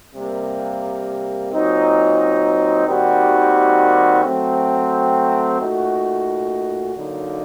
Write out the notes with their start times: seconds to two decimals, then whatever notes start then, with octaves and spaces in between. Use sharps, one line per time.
0.15 C3 G3 A#3
1.52 A#2 F#3 C4 D#4
2.87 D#2 D#3 G3 C4 F#4
4.24 F#3 A3 C4
5.60 A#2 A3 D#4 F#4
6.96 D3 F#3 A#3 D#4